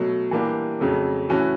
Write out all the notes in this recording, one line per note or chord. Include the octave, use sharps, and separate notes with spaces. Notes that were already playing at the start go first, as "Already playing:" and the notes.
Already playing: B2 F#3 A3
E3 G3 A#3 D4 G4
F2 C#3 F#3 A3
E3 A3 C#4 F#4 A4